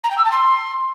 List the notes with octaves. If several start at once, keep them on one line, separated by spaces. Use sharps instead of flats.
A#5
G5
E6
A5
C6